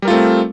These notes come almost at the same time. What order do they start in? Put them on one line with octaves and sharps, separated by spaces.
G3 A#4 F4 A3 C4